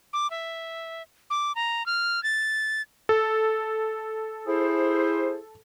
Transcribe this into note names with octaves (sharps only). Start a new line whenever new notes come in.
D6
E5
D6
A#5
F6
A6
A4
E4 G#4 C5